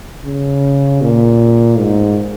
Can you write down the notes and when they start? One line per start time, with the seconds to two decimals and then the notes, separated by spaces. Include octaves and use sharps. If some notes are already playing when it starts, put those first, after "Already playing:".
0.25 C#3
1.02 A#2
1.79 G#2